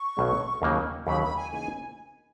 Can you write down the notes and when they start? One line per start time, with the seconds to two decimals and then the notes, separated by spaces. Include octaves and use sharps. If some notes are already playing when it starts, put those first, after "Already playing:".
Already playing: C#6
0.17 B1 B2 F#3 C#4
0.62 D#2 C#3 F#3 A#3 D#4
1.06 D#2 C#3 F#3 A#3 D#4 B5
1.22 B5
1.36 G#5
1.52 C#3 E3 A#3 D#4 G#5